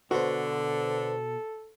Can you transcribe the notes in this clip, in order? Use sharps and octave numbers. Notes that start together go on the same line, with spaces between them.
B2 D3 F#4 A4 B4 C5